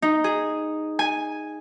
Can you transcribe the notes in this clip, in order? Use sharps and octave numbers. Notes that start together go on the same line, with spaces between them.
D#4
G#4
G#5